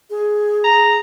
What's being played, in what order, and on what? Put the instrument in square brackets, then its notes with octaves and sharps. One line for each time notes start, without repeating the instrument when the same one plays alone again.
[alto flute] G#4
[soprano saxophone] A#5